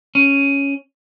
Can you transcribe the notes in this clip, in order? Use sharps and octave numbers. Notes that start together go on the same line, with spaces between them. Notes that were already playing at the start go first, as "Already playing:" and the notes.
C#4